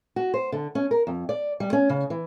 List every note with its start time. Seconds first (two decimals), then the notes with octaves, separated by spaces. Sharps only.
0.16 F#4
0.34 C5
0.52 D3
0.75 C#4
0.91 A#4
1.07 F2
1.29 D5
1.60 G3
1.73 C#4
1.89 C#3
2.10 E3